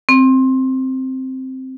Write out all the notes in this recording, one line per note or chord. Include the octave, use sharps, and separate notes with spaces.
C4